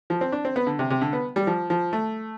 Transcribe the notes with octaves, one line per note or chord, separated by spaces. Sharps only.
F3
C4
D4
C4
B3
D3
C3
C3
D3
B3
G3
F3
F3
A3